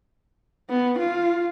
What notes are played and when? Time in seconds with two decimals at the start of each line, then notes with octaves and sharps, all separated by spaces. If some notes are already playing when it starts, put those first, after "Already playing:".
0.70 B3
0.99 F4